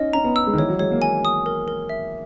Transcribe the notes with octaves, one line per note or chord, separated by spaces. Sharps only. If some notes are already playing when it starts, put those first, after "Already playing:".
Already playing: C#4 D#4 D#5
C#4 A#5
B3
E6
G#3
D#3
E3 C#5
F#3
G#3 C#5
A#3
A#3 G#5
D#6
A#4
A#4
E5